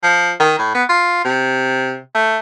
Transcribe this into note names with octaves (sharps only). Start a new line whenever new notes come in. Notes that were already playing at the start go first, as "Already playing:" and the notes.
F3
D#3
A2
B3
F4
C3
A3